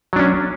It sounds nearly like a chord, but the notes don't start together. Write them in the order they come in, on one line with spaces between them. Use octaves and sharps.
F#3 D4 C#4